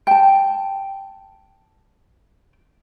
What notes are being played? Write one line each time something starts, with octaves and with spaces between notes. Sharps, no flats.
G5 A5